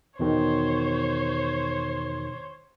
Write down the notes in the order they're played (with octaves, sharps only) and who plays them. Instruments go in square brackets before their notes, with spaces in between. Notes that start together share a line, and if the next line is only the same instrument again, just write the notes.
[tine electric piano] E2 B2 D#3 [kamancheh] C5 C#5